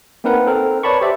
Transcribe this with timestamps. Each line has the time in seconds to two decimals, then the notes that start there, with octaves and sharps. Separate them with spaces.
0.24 A#3 C4 D#4 A#4 B4 F#5
0.47 C4 A4 A#4
0.83 B4 C#5 D5 A5 B5 C#6
1.01 G4 C5 D5 E5